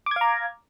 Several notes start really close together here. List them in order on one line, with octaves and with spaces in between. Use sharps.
D6 G#6 F5 A#5